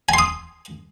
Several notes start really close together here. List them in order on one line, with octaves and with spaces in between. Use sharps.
G#5 C6 D#6